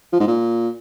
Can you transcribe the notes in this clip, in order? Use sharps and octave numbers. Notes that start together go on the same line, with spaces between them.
F3
G#2
A#2